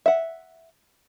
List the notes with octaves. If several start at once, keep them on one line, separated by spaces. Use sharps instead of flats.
E5 F#5